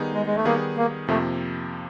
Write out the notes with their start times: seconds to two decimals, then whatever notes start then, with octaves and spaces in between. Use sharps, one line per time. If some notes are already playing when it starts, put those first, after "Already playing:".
Already playing: D#3 G3 B3 D#4 G#4
0.14 G#3
0.26 G#3
0.36 A3
0.45 D#3 G3 A#3 B3 D#4 G#4
0.77 A#3
1.08 F2 C3 F3 A3 A#3